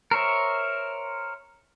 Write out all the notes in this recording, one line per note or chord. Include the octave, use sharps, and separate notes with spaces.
A#4 C5 C#5 E5